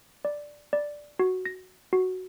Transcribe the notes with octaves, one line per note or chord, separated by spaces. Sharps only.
D5
D5
F#4
A#6
F#4